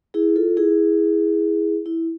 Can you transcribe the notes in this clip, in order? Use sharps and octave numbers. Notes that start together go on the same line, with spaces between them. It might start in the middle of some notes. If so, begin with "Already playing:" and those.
E4 G#4
F4 A4
E4 G#4
E4